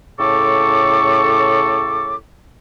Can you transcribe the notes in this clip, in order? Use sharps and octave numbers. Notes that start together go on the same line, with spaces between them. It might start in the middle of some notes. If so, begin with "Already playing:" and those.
A2 C#3 A4 C#6 D6